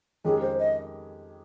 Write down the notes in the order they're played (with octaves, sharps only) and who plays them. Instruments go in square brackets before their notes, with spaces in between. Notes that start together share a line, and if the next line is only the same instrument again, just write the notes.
[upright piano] F2 D#3 G#3 C#4 G4 [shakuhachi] G#4
[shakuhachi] C5
D#5